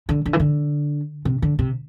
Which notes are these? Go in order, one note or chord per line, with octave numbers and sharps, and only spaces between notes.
D3
D3
E3
D3
C3
D3
C3